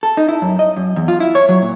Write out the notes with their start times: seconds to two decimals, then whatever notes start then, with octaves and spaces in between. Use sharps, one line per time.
0.03 A4
0.17 D#4
0.28 E4
0.42 F#2
0.59 D#5
0.77 F#2
0.96 E2
1.08 F4
1.20 E4
1.35 C#5
1.49 F#3
1.62 A#2